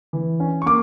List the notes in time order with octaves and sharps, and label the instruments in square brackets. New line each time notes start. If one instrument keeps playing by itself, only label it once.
[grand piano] E3
C#4
C#6
A#3 D6